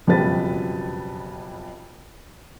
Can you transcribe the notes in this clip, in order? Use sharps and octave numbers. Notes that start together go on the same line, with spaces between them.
F#1 F2 B2 G3 B4 A6